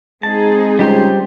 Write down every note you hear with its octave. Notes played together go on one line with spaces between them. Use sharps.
G#3 C4 D#4 G#4 A5
C#2 G3 G4 C5